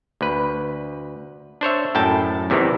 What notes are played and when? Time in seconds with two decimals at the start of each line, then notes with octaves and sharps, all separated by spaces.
0.21 D2 B4
1.61 D4 C5 C#5 E5
1.95 F#2 A2 G5 A5
2.50 E2 C3 D#3 E3